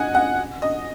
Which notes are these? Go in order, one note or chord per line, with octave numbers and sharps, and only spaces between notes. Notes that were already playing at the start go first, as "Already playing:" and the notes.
Already playing: D#5 F#5 G#5
F#5
D#5